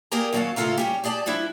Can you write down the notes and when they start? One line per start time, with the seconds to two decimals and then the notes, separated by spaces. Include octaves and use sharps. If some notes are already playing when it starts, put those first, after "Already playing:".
0.11 A#3 G4 G#4 A#4 D5 A#5
0.33 D#2 F#3 C#4 D5 F5 A5
0.56 A2 C#3 F4 A4 F5 A#5
0.78 G3 C#4 G4
1.04 G4 G#4 D5 G#5 A5
1.26 F3 G3 D4 E4